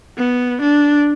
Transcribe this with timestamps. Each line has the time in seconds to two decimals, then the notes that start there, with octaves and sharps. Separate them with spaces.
0.18 B3
0.62 D4